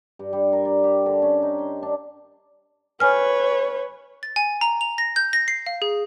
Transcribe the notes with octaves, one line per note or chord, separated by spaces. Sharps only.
G2
G3
A#4
D5
G4
D3
C#4
D#4
C6
D4
B4 C#5 G#5 F6
A6
G#5
A#5
F7
A#6
G6
A#6
C7
F5
G#4